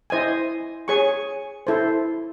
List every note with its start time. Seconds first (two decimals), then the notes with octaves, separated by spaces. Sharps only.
0.10 E4 C5 D#5 G#5
0.88 G#4 C#5 G#5 C#6
1.67 E4 A4 C5